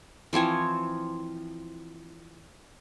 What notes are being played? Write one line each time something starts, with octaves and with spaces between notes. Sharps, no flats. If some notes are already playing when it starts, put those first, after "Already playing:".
E3 F3 C4 C#5